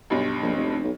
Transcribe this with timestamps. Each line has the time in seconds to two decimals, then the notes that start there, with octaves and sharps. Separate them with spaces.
0.10 B1 G2
0.43 A#1
0.56 F1
0.84 B1